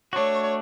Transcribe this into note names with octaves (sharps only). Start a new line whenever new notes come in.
A3 D4 F#4 C#5